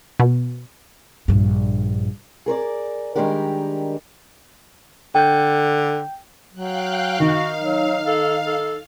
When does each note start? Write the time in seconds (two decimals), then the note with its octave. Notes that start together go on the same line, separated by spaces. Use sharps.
0.20 B2
1.28 A#1 G2
2.46 G#4 A#4 C5 D5
3.15 D#3 G3 G#3 D4 G4 A#4
5.15 D3 G5 G6
6.54 F#3 F5 G5 F#6
7.20 D#3 D#4 F#4 F5
7.62 F#3
8.06 A4
8.46 A4